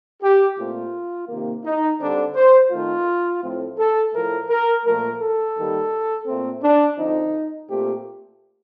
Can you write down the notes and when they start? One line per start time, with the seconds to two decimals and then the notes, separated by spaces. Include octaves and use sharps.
0.22 G4
0.58 A#2 A3 C4 F4
1.29 C3 D#3 A#3
1.64 D#4
2.00 D3 G3 C4 D4
2.35 C5
2.71 D#3 A3 C4 F4
3.43 A2 F3 A3 C4
3.77 A4
4.13 A2 F3 A3 A#4
4.49 A#4
4.85 A#2 F3 A3 A#4
5.20 A4
5.56 D#3 G3 A#3
6.26 A#2 A3 C4
6.62 D4
6.97 D3 F3 C4 D#4
7.68 A#2 A3 C4 G4